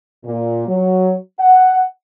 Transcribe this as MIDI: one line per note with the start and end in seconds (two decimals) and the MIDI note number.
0.25 0.65 46
0.68 1.15 54
1.39 1.83 78